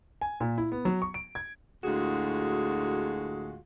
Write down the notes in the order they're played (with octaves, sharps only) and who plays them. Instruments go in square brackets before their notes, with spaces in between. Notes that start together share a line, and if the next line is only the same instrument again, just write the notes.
[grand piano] G#5
A#2
E4
B3
F#3
C#6
D7
G#6
[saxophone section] D2 A2 G#3 F4 F#4 G#4